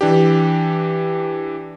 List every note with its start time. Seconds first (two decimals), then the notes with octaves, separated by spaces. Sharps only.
0.01 E3 D4 G4